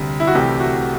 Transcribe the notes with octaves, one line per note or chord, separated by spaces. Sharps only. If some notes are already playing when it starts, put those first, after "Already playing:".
Already playing: D2 C3 G3
E4
F#4
C2 C3 E3 A3 G4
F#4